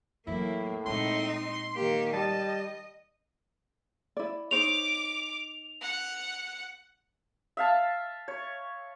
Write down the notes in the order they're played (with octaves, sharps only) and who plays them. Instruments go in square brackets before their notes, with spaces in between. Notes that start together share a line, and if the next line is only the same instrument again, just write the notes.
[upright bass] E2 F#3 [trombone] A2 [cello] A#3 [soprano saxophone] E4
[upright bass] A#2 G#3 [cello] C4 D#4 [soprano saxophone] C6
[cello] D#3 G4 [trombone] A#3
[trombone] G3 [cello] D#5 [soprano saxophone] A5
[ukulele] E4 D5
[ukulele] D#4 C5 C#5 [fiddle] D6 [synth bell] F7
[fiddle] F#5
[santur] E5 F5 A5
C#5